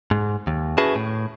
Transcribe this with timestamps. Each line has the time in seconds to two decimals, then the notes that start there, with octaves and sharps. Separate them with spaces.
0.11 G#2
0.47 D#2
0.78 C#4 E4 F#4 G#4 B4 A5
0.95 A2